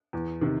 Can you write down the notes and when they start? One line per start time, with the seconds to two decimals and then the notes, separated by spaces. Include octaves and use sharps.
0.13 E2
0.41 C3 D#3